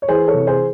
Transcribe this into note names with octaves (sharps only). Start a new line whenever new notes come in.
C#5
E3 G#4 C5
A4 C#5
C3
G#4 C5